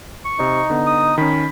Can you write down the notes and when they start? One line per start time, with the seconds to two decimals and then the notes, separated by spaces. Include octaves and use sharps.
0.25 C#6
0.39 C3 D#4 C5
0.70 D3 B3
0.87 D#6
1.18 D#3 C#4 B5